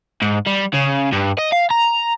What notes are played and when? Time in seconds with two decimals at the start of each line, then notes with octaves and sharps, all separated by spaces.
0.22 G#2
0.46 G3
0.73 C#3
1.12 G2
1.39 D#5
1.53 F5
1.71 A#5